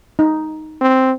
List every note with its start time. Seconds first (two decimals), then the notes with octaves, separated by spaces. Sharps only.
0.19 D#4
0.81 C4